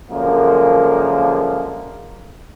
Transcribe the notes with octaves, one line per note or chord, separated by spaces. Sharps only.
F#2 D3 F3 G#3 A#3